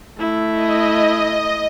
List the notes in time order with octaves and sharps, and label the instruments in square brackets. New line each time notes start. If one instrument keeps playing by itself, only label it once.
[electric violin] A3 E4
[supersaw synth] D#5